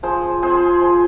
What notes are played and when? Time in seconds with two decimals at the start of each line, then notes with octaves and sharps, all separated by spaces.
0.03 F3 G#4 C5
0.42 C4 F4 G#4 C5
0.82 F3